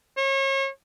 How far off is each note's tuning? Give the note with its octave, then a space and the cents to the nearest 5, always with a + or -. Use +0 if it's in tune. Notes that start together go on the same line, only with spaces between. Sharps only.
C#5 -35